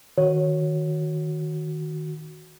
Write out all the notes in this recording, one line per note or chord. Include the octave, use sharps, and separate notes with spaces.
D#3 F#4 C#5